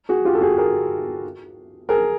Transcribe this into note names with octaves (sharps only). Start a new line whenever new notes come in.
F#4 G#4
F4 G4
A4
F#4 G#4
G#4 A#4
G#4 A#4